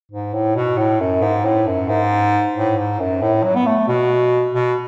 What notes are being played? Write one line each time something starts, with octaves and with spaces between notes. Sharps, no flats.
G#2
A2
B2
A2
F#2
G#2
A2
F#2
G#2
A2
G#2
F#2
A2
F#3
B3
A3
B2
B2